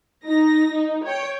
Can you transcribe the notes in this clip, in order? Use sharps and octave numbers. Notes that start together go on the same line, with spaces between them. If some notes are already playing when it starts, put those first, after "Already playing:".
D#4 A#6
D#4
C#5 G5